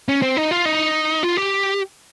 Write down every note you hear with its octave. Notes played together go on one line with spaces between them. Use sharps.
C#4
C4
D#4
F4
D#4
F4
G4